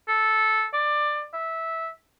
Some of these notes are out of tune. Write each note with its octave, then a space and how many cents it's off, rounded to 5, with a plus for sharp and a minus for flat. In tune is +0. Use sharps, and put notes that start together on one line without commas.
A4 -10
D5 +20
E5 -15